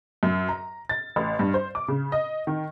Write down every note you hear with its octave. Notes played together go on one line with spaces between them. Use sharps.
F#2
A#5
A6
A1
G2
C5
D6
C#3
D#5
D#3